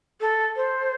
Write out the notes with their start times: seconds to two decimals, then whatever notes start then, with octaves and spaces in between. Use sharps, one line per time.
0.21 A4
0.56 C5